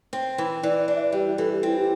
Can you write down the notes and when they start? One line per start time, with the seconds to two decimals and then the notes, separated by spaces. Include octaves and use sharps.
0.13 C4
0.38 E3
0.63 E3 D5
0.88 D4 D5
0.95 E5
1.03 D5
1.12 G3 G4
1.38 E3 A4
1.51 G4
1.63 C4 E4
1.79 G4